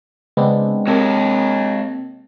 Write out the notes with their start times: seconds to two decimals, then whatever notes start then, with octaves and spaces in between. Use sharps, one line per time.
0.37 C#3 G#3 B3 C4 D4
0.87 C3 A#3 C4 C#5 D#5 A5